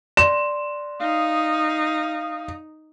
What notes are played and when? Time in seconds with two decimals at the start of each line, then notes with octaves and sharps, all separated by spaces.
0.17 D5 C6 E7
1.01 D#4 F5 D#6